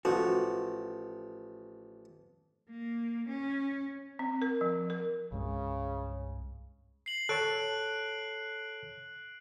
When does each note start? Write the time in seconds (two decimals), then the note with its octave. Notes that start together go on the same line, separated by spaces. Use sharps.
0.05 A1 F3 F#4
2.70 A#3
3.28 C#4
4.19 C4
4.42 A#4
4.61 F3
4.90 A#4
5.32 C2 G2 C#3 G#3
7.06 C7 F#7
7.29 A4 C#5 A5 F#6 D7